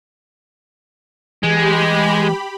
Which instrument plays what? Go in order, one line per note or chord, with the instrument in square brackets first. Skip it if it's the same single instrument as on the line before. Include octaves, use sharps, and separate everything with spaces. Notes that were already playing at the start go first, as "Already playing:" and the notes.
[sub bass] E3 [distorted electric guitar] G#3 [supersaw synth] G4 B5